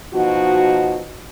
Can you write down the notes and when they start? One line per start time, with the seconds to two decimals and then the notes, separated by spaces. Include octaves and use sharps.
0.14 B2 F3 D#4 F#4